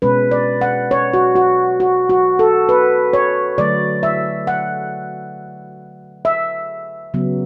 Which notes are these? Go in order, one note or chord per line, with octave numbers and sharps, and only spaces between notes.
B2 G#3 C#4 B4
D5
F#5
C#5
F#4
F#4
F#4
F#4
A4
B4
C#5
D3 F#3 A3 D5
E5
F#5
E5
C#3 F#3 B3